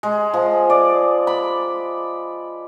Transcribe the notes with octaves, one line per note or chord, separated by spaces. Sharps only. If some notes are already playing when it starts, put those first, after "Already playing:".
G#3
F3
D5
B5